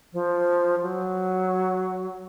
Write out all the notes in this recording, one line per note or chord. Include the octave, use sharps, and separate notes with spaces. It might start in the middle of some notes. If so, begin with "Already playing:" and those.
F3
F#3